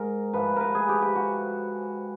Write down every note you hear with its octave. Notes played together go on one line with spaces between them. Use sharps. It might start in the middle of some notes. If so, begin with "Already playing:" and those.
Already playing: G#2 G#3 A#4
G#2 F3 A3 B4
A#4 B4
G#4
G4
G4
F#4